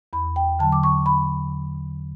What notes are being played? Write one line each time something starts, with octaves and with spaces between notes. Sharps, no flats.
E2 B5
G5
D3 F#3 A5
D6
C#6
B5